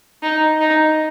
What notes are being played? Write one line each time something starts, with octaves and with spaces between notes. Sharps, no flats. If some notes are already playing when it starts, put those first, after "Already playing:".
D#4
D#4